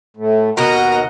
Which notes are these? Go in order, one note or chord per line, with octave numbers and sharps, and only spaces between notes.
A2 A3
D#2 B2 F#4 A#4 D#5 F#5 A#5